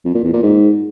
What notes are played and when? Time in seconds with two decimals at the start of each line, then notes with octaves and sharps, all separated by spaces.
0.05 F2
0.14 A#2
0.24 E2
0.33 A#2
0.43 G#2